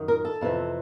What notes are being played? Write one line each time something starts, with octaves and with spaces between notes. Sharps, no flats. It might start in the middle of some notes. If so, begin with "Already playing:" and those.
Already playing: F#2 D#3
A#4
A4
F2 C3 E3